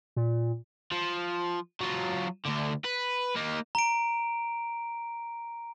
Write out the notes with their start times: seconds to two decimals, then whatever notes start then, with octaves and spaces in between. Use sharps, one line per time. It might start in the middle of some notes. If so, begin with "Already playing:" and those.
0.16 A#2
0.91 F3
1.80 F#3 F4
2.46 D2 D3
2.85 B4
3.36 A#3 D#4
3.75 A#5 D7